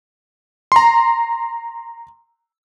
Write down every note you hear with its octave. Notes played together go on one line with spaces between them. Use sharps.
A#5 C6